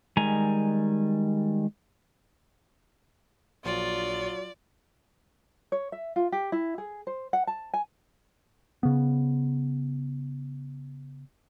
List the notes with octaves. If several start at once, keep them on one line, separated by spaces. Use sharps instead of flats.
D#3 G3 G#3 G#5 A#5
A#1 F#3 F4 D5
C#5
E5
F4
G4
E4
G#4
C5
F#5
A5
G#5
C#3 B3